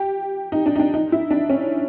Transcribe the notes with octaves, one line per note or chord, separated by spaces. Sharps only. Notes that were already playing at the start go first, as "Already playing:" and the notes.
Already playing: G4
D#4
D4
D#4
D4
D#4
E4
D4
C#4